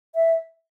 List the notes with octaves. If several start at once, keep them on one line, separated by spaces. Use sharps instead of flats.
E5